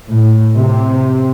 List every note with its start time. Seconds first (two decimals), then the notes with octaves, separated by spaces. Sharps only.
0.10 A2
0.57 C3